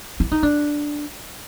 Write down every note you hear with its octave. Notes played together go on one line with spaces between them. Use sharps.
E4
D#4
D4